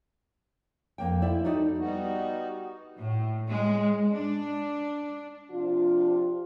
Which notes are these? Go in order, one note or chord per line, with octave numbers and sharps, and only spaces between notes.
F2 A#3 G5
E4 C5 D5 E5
D#4 F#4 A4 D5 D#5
G3 B3 D#4 F#4
A2
G#3
D4
C3 F3 D4 F4